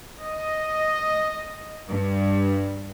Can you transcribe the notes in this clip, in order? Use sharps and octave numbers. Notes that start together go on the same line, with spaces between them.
D#5
G2